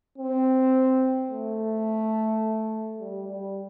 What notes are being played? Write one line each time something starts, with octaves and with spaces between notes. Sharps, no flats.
C4
A3
G3
G3